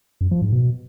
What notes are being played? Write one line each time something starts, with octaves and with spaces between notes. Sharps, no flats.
F#2
F3
G#2
B2